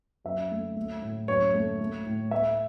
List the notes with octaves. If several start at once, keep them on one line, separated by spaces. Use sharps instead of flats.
F#2 E5
A3
A3
A2
F#2 C#5
A3
A3
A2
A3 E5